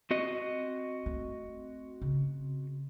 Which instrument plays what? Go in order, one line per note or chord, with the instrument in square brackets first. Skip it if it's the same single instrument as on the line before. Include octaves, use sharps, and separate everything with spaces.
[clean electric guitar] C4 F#4 D#5
[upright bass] A3
C#3